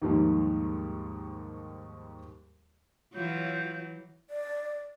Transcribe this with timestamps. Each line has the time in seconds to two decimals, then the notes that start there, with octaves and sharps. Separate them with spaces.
0.02 D#2 G#2 D#3 F3 G3 A#3
3.13 E3 F#3 F4 C#5 G6
4.30 D5